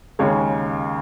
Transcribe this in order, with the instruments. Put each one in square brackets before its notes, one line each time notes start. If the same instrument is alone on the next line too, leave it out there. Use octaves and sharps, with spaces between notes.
[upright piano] D#2 C#3 G#3 C#5